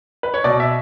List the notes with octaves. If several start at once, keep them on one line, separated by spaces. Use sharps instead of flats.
B4
C#5
B2 D5
E5